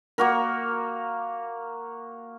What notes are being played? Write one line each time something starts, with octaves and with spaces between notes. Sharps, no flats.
A#3 F#4 A#4